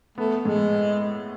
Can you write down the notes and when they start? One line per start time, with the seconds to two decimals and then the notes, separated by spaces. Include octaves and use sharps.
0.18 A3 B3
0.45 A2 G#3